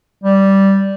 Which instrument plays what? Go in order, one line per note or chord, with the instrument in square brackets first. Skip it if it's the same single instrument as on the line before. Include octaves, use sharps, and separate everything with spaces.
[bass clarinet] G3